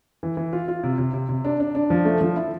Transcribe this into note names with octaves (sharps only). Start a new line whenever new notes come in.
E3
E3
F4
F4
C3
C3
C3
C3
D4
D4
D4
F3
A3
F3
E4